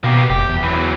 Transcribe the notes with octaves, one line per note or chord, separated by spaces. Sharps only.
B2 A#3 G4
F1 G4
E2
E3 F#3